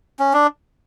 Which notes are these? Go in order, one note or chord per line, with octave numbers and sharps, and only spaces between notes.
C#4
D4